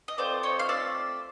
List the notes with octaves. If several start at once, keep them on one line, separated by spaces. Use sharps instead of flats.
D#5
A3 C4 F4 C5 D5
C#5 D#5
F5
D5 E5